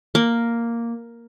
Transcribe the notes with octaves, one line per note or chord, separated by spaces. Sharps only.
A#3